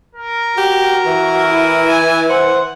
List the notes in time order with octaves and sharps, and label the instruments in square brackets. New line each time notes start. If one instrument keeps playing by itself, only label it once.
[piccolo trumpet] A#4
[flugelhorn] F#4 [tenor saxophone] G4
[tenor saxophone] E3
[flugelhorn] E4
[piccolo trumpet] G#5
[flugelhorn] C5 [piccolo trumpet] F#5